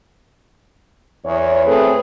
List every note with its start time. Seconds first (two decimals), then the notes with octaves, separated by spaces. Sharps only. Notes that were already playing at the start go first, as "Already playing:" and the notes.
1.25 E2 C#5
1.67 A3 C4 G#4 A4 B4